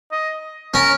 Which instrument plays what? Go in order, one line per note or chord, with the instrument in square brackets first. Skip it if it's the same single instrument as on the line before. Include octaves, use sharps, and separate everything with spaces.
[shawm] D#5
[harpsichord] C#4 [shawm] A#4